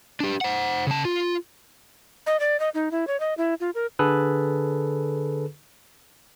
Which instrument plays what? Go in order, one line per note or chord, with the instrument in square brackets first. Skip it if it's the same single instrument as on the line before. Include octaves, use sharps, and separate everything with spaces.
[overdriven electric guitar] D4 G4
C5 F#5
C#3 A5
F4
[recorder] D#5
D5
D#5
D#4
E4
C#5
D#5
E4
F4
A#4
[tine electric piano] D3 G#4 A4 B4